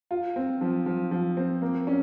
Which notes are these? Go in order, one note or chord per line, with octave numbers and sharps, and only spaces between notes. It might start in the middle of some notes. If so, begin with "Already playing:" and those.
F4
C4
F3
F3
F3
C4
A#3
C#4